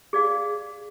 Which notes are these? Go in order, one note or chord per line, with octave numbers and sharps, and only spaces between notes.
G#4 D5 F5